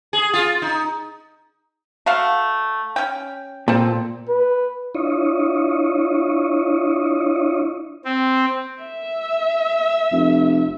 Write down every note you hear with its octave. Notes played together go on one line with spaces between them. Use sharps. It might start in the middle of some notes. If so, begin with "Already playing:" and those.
G#4
F4
D#4
A3 F#4 F5
C#4 G5
A#2 C4 A4
B4
D4 E4 F4 C#5 D#5
C4
E5
F1